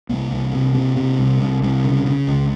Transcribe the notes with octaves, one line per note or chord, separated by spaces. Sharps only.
C2 A#3
C2
C3
C3
C3
C2
C2
C2
C#3
C#3
C#2